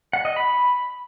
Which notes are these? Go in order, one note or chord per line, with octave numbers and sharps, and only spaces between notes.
F#5
D#5
B5